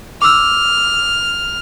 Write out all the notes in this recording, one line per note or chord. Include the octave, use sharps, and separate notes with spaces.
D6 E6 F6